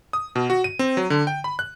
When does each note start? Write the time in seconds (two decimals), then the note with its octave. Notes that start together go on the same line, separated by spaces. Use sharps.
0.13 D#6
0.35 B2
0.50 F#4
0.64 D#7
0.79 C4
0.97 F#3
1.10 D3
1.27 G5
1.44 B5
1.59 F#6